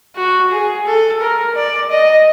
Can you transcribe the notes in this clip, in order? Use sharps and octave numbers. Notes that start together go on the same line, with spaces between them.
F#4
G#4
A4
A#4
D5
D#5